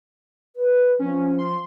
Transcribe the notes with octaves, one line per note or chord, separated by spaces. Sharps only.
B4
F3 C#4
C6